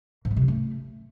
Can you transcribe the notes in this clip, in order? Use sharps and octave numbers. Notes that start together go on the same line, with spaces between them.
G#2
A3
C3
C#4
A3